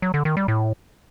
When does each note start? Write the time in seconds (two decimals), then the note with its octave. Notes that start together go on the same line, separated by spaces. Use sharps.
0.02 F#3
0.14 D3
0.25 D#3
0.37 G3
0.48 A2